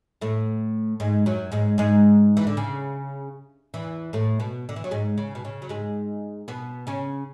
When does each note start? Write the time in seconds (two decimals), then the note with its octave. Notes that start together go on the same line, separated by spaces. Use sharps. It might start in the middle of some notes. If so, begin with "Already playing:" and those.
0.21 A2 A3
1.00 G#2 G#3
1.26 F#2 F#3
1.52 G#2 G#3
1.78 G#2 G#3
2.37 E3
2.47 D3
2.57 C#3
3.74 E2 E3
4.13 A2 A3
4.40 B2 B3
4.69 D3
4.76 E3
4.84 F#3
4.91 G#2 G#3
5.18 C#3
5.35 B2
5.45 C#3
5.62 F#3
5.69 G#2 G#3
6.48 B2 B3
6.87 C#3 C#4